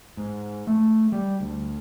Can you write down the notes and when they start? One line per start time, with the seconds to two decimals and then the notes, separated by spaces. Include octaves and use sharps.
0.17 G#2
0.67 A3
1.12 G3
1.40 D2